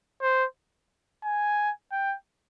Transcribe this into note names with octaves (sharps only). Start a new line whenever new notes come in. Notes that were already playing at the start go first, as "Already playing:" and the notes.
C5
G#5
G5